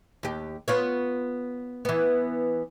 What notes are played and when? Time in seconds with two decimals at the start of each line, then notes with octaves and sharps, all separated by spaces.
0.23 D#2 G4
0.68 B3 F4 C#5
1.85 E3 B3